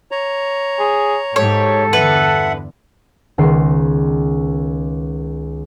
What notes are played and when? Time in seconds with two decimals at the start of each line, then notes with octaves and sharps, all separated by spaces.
0.11 C#5 A#5
0.79 G#4
1.36 G#2 G4 A4 C#5
1.93 E2 G2 D3 B4 E5 F#5
3.38 C#2 D#3 B3 C6 C7